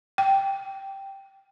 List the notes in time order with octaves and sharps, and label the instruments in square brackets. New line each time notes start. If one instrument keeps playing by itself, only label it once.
[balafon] G5